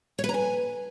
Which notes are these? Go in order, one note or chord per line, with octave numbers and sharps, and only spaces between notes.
C#5
B4
A#5
G#5